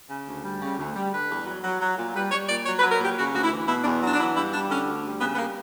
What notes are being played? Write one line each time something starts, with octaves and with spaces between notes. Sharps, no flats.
C#3
D2
G3
C#3
D2
G3
D3 B4
E2
F#3
F#3
F#3
A#2
G3 B4
G3 C#5
A#2 D5
F#3 C#5
B4
F#3
A#4
A#2 G4
C#3 F#4
D2 F#4
E4
E3
B2 E4
D4
E2
F#3 D4
D4
E3 E4
G2 E4
G3 D4
D3 C#4
D2
G3
C#3 B3
B3
G3 A#3